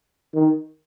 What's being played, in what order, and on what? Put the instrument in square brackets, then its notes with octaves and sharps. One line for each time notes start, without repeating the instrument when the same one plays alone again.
[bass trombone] D#3